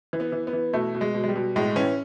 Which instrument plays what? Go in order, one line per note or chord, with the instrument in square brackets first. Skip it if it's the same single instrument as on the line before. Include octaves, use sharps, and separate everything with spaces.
[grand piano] E3
B3
E3
B3
E3
B2 A3
B2
G#3
B2
G#3
G3
B2
A2 G#3
E3 C#4